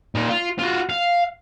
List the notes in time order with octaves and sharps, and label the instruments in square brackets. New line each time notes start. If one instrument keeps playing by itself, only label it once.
[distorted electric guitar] A#2 D#4
F4
F4 F#4
F5